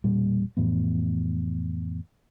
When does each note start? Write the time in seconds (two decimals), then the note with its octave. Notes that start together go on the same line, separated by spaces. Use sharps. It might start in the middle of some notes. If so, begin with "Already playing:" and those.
0.04 E1 A#2 G3
0.57 F2 A2 E3 B3